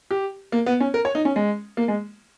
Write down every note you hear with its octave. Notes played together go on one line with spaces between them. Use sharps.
G4
A#3
B3
C#4
A#4
C#5
D#4
C#4
G#3
A#3
G#3